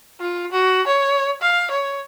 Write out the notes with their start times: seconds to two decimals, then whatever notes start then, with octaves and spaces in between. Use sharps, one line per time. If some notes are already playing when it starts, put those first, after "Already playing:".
0.20 F4
0.52 F#4
0.87 C#5
1.41 F5
1.71 C#5